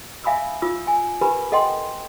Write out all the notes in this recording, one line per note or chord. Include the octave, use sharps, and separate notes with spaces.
E5 F5 G#5 B5 D#6 E6
F4 D#6 E6
G#5
G4 A#4 B4 G#5 B5
A4 D#5 F#5 G5 C6